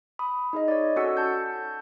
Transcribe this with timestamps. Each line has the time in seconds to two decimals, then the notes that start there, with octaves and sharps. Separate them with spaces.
0.19 B5 D#6
0.53 D#4 G#4 D#5
0.68 C#5 D5
0.96 C#4 F#4 A4 F#5 E6 C#7
1.17 A5 G6